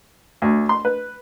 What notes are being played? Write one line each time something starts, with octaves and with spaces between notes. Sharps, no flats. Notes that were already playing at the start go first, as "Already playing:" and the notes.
D2
C6
B4